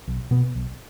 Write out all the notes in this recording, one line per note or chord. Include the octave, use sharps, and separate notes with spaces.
B1
B2 B3
B1